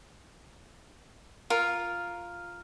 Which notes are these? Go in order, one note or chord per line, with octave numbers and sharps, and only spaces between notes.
F4 A#4